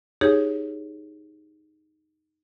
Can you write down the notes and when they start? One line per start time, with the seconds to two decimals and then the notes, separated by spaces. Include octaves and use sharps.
0.21 D#4 G4 G#4 C#5